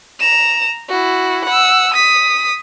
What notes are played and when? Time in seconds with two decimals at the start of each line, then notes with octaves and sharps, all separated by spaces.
0.20 A#5 E7
0.89 E4 F#4
1.45 F#5 E6
1.94 D#6 B6